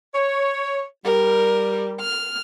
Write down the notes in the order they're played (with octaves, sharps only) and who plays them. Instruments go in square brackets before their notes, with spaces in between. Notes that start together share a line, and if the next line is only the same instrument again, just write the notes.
[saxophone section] C#5
[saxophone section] G3 [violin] A#4
[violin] F6